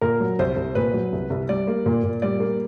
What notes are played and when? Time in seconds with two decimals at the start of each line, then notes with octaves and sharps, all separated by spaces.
0.01 A#2 A#4
0.20 F#3
0.39 C2 C5
0.56 C2
0.75 A#2 B4
0.93 F#3
1.12 C2
1.30 C2
1.49 G3 D5
1.67 A#3
1.86 A#2
2.04 A#2
2.22 G3 D5
2.40 A#3